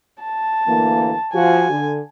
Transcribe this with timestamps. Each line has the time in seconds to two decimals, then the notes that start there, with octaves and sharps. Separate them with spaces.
0.23 A5
0.68 D2 E3 A#3
1.34 F3 F#4 G#5
1.71 D3